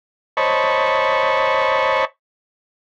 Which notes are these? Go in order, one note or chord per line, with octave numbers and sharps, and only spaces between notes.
C5 C#5 D#5 A5 B5 C#6